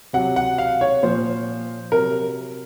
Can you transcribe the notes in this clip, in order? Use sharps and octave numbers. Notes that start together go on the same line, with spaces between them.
C3 F#3 F#5
F#5
F5
C#5
A#2 F3 C5
C3 F#3 A#4